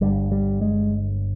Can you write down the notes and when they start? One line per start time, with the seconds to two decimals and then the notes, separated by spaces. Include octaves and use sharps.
0.01 G1 G2 D3 G3
0.32 G3
0.61 G#3